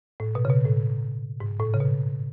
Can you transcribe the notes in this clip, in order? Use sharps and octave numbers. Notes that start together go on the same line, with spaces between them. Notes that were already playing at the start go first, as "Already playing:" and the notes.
A2
B2
C#3
B2
A2
G#2
A2
C#3
B2